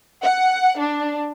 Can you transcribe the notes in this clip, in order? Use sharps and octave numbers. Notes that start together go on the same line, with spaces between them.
F#5
D4